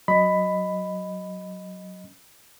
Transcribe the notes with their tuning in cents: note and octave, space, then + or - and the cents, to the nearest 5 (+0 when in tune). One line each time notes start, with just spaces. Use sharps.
F#3 +0 D#5 +0 B5 +10